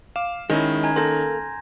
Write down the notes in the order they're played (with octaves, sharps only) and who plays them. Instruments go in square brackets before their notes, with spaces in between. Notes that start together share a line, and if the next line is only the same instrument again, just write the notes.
[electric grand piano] F5 D6 [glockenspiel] E7
[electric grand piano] D#3 C#4 [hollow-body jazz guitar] G#3 D#4 E4
[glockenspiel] G#5 A#5 G#6
[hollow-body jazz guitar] A#3 A4 [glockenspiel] C6 G6 A#6